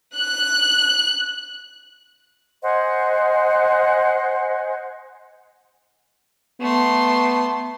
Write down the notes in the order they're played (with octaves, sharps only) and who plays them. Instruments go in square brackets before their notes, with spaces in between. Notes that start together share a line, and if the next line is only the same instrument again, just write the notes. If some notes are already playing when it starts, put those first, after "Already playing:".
[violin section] F#6
[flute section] C5 D#5 F#5 G#5
[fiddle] A3 C6 [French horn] B3